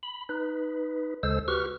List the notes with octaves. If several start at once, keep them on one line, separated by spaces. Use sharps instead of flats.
B5
D#4 B4
D2 C#3 G#3 A4 C5 E6
F#4 G4 B4 C#6 F6